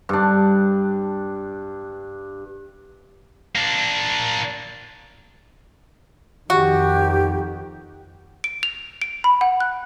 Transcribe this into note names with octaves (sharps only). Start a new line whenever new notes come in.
G2 D4
A#3 D4
F2 D#3 F#4 G4
D7
F7
D7
B5
F#5
F#6